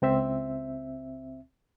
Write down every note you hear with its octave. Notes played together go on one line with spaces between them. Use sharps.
C#2 C4 E5